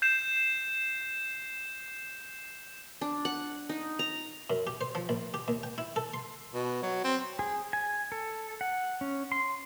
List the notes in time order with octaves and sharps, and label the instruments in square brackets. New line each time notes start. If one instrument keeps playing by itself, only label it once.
[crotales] G6 C7 E7
[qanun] D4
F#5
D#4
A#5
[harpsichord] F#2
G4
C5
F3
A#1
G4
D#2
G5
E4
A4
C6
[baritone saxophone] B2
F#3
C4
[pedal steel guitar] G#4
G#5
A4
F#5
C#4
C6